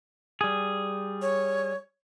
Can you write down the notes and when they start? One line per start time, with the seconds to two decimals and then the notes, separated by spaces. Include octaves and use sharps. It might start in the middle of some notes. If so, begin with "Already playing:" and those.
0.41 G3 G#4
1.22 C#5